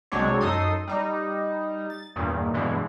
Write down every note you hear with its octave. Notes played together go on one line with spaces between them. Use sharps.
C2 F#3 G#3 C4 D4 C#5
F#2 D#4 A4 C6 D#6
G3 D#4
A6
E2 G2 A#2 D#3
G2 B2 D3 E3 G#3